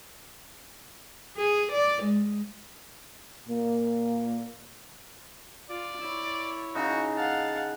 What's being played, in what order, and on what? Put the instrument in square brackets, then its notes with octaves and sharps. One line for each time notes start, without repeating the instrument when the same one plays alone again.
[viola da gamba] G#4
D5
G#3
[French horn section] A#2 A#3
[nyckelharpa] F4 [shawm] D5
[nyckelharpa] E4 C#5
[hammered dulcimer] C#3 D#4 [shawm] F#4
[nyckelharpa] F5 F#5 [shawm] A5